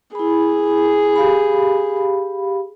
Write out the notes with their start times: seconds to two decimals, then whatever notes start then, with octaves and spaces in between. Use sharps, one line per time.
0.15 E4 G#4 B5
1.16 G4 F5 B5